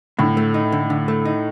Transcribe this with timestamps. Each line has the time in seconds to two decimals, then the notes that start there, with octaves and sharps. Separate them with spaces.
0.19 A2 D3
0.37 A3
0.54 D#4
0.72 D3
0.90 D3
1.08 A3
1.25 D#4